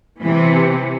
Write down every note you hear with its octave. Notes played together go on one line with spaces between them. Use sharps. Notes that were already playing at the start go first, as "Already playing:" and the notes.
C3 E3